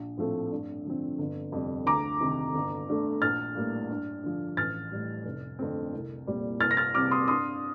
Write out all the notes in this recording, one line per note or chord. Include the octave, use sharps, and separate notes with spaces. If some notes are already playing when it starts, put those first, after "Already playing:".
Already playing: A#1
A2 F3 A3 C4
G2
D3 F3 C4
G1
F2 C3 G3
D2 A#5 D6
C3 D#3
G1
G2 D3 A3
A#1 F6 A6
A2 G3 A#3
G2
D3 F3
A1 F6 A6
A2 G3
F1
F2 D3 A3 C4
C2
A#2 G3 C4
C2 F6 A6
A#6
F6 A6
C3 G3 C4 D6 F6
C6 D#6
G2 C6 D#6